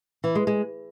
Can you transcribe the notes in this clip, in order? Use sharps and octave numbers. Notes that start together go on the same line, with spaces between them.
E3
G#3
G#3